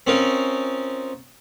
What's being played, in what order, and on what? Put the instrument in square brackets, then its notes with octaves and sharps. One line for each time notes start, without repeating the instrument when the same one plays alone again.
[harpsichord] C4 C#4 D#4 F4 A#4